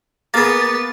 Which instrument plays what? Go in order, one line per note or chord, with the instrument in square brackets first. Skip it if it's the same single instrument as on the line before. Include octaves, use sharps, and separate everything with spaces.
[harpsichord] A#3 G#4 [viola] B3 [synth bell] A6